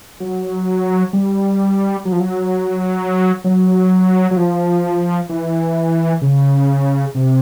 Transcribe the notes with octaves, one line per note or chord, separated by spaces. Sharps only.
F#3
G3
F#3
F3
F#3
F#3
F#3
F3
E3
C#3
C3